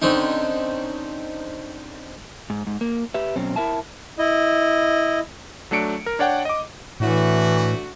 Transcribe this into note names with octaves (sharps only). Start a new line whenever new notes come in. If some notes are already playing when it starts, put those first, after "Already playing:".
D3 C4 C#4 D#4
G#2
G#2
A#3
G4 B4 E5
B2 F#3 C4 C#4
E4 A#4 E5 A5
E4 D#5
F#3 A3 D4 C#7 D7
A#4
D4 C#5 D5 F#5 G5
D#5 D6
A2 E3 A3 D4 F#4